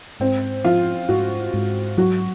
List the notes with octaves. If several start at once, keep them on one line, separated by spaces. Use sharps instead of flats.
G#2 C4
F3 F4
G#2 F#4
G#2
F#3 F#4